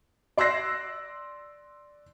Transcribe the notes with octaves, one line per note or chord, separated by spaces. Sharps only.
D5 C6 E6 F#6 A#6 C7